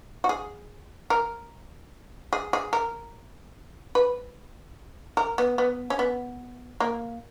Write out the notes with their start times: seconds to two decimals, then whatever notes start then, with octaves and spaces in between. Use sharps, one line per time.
0.24 F#4
0.29 G#4
1.10 A#4
2.33 G#4
2.53 G#4
2.73 A#4
3.95 B4
5.17 A#4
5.38 B3
5.58 B3
5.90 C#4
5.99 B3
6.80 A#3